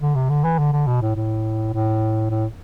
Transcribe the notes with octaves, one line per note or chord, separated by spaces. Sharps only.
D3
C3
D3
E3
D3
D3
B2
A2
A2
A2
A2